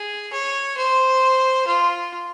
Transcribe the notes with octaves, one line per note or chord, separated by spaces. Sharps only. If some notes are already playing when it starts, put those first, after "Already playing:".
Already playing: G#4
C#5
C5
F4